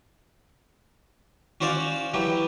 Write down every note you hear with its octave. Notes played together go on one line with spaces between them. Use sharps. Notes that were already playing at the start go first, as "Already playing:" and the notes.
C#4 F#4 C5 D5 F5
E3 F#3 G4